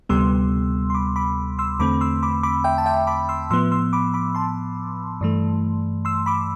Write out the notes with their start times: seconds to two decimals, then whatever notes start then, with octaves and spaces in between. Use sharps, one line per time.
0.09 D2 C3 G3 B3 C6 E6
0.90 C6
0.94 B5 D6
1.16 B5 D6
1.58 C6 E6
1.79 E2 D3 A3 C4 B5 D6
2.01 C6 E6
2.23 B5 D6
2.43 B5 D6
2.64 E5 G5
2.78 A5
2.86 E5 G5
3.07 B5 D6
3.29 C6 E6
3.51 A2 F3 B3 C6 E6
3.72 C6 E6
3.93 B5 D6
4.14 B5 D6
4.35 A5 C6
5.21 G2 E3 A3
6.05 C6 E6
6.26 B5 D6